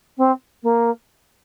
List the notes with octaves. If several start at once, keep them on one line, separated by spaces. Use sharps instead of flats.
C4
A#3